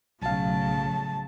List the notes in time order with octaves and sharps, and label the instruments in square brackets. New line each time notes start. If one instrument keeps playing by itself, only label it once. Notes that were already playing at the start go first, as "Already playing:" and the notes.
[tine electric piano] B1 F5 [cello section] A2 C#3 [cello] F#3 [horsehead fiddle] A5